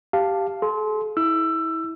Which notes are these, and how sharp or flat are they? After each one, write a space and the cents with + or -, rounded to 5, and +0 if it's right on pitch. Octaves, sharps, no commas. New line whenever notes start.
G4 +0 F5 +0 A5 +0
A4 -45 C6 +0
E4 -30 E6 +20